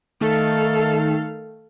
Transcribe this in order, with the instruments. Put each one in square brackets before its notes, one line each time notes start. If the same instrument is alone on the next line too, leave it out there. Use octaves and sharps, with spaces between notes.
[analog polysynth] D#3 A3 [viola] A4 F5